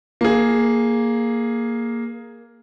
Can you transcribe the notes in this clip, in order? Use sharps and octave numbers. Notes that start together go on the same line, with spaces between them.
A#3 G#4